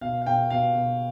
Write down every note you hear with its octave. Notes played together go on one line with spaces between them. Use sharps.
B2 F5
F5
B2 G5
B2 F5
B2